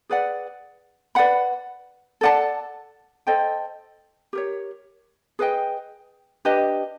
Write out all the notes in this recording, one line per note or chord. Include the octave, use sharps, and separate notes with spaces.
G#4 B4 D5 F#5
B4 D5 F#5 B5
A4 D5 F#5 A5
A4 C5 D#5 G5
G4 A#4 C#5
G#4 B4 D#5 G5
D4 G4 B4 D#5